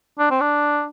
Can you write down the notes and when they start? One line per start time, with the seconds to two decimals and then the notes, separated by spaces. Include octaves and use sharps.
0.19 D4
0.31 C4
0.41 D4